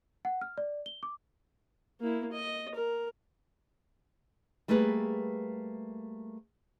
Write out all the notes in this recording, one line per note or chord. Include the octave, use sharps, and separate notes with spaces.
F#5
F6
D5
G7
D6
A#3 E4
D#5
A#4
G3 A3 A#3 G#4 B4